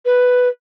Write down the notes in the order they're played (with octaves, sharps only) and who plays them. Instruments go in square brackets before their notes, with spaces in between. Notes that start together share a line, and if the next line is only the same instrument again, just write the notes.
[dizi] B4